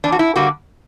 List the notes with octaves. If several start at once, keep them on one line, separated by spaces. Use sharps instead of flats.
E2 D4
F#4
E4
D3 G3 A#3 F#4